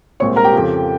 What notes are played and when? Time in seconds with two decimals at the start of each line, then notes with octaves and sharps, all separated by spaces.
0.20 C2 A#2 G#3 C4 C#5 C#6
0.36 A#4 A#5
0.44 G4 G5
0.52 F2 C#3 F3